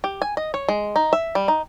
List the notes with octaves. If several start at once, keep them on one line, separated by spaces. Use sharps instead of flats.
G4
G#5
D#5
C#5
G#3
D#4
E5
G3
D#4